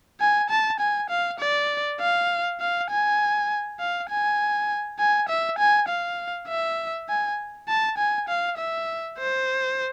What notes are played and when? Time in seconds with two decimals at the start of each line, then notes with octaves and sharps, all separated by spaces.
0.20 G#5
0.50 A5
0.80 G#5
1.10 F5
1.39 D5
2.00 F5
2.60 F5
2.90 G#5
3.80 F5
4.10 G#5
4.99 G#5
5.29 E5
5.58 G#5
5.88 F5
6.48 E5
7.09 G#5
7.68 A5
7.98 G#5
8.28 F5
8.58 E5
9.19 C5